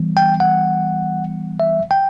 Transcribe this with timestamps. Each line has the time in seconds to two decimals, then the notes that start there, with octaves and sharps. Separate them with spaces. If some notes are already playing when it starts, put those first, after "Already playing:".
Already playing: E3 G3 B3
0.17 G5
0.40 F#5
1.60 E5
1.91 G5